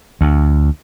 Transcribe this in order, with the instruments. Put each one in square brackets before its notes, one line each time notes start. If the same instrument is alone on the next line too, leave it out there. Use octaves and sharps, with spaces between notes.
[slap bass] D2